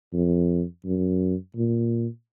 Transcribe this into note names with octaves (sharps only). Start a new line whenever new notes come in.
F2
F#2
A#2